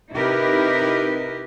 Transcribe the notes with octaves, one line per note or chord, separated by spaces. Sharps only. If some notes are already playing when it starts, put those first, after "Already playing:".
C3 D#4 E4 G4 A#4 B4